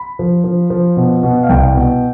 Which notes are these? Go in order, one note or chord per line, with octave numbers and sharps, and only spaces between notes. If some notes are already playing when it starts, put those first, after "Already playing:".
Already playing: B5
F3
F3
F3
B2
B2
F5
C2 G5
B2